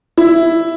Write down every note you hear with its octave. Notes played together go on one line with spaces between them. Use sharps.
E4